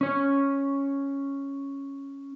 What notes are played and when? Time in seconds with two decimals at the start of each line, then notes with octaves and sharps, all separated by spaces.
0.01 C#4 C#5